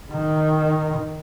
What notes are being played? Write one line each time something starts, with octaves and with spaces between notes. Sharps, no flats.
D#3